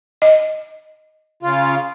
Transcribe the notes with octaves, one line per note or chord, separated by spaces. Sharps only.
D#5
C#3 F4